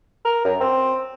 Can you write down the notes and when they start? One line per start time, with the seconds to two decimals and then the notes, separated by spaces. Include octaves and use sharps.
0.25 A#4
0.45 F#2
0.60 C4